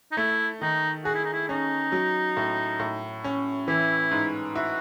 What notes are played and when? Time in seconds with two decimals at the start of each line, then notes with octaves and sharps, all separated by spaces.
0.12 D#4
0.17 A3 E4
0.61 D#3 D#4
1.05 F#4 G#4
1.15 E4
1.24 D#4
1.33 E4
1.48 C#4 D#4
1.92 F#3
2.37 A2
2.79 A2
3.24 C#4
3.68 E3 E4
4.11 G#2
4.55 E4 F#4